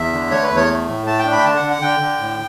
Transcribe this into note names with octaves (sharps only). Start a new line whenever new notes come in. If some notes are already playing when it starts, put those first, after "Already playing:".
Already playing: E2 E5
D3
A3 C#5
B4
E2
C#5
A3
A2
A3 A5
G5
D4
B5
G5
D3 A5
F#5
D3
F#5
D3 G5
D3
A2